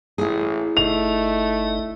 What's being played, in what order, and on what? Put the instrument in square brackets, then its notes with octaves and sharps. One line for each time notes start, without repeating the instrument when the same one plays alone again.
[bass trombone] A1 [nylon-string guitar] E4 G#4
[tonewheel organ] G1 D#4 D#5 [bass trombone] A3 [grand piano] F7